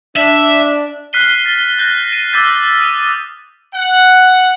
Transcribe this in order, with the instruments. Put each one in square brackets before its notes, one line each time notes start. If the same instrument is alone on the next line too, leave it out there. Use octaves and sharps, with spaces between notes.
[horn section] D4 [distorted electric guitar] E5
[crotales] F6 F#6 B6 C7 D#7 G7
A6
F#6 G6 A#6
D#7
D6 E6 F6 G6 A6 B6
D#6 D#7
[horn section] F#5